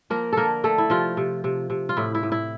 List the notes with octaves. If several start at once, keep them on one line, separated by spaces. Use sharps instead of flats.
F3 A#3 A#4
D3 A#3 A4 A#4
D3 A3 A4
E4
C3 F3 F4
C3
C3
C3
F4
A2 E4
E4
A2
E4